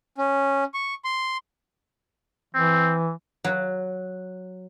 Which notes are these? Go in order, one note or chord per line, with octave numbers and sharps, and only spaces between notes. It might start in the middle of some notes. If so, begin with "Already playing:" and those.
C#4
C#6
C6
E3 C4
F#3